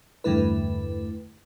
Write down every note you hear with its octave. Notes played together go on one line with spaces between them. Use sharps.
E2 G2 D3 A3 E4 B4